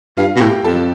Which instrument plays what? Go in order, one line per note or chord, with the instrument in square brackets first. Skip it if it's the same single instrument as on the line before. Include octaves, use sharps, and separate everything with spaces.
[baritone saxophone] G2 [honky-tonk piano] F4 F5
[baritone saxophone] B2
[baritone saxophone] A2 [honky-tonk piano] G4 G5
[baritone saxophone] F2 [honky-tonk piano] A4 A5